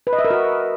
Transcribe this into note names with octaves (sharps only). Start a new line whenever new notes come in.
B4
D#5
E5
A#4
F#4